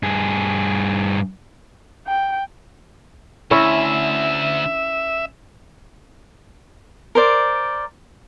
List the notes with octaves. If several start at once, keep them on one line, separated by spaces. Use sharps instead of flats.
G2 G#4
G5
D2 C#4 E4 C#5 E5
A#4 C5 D5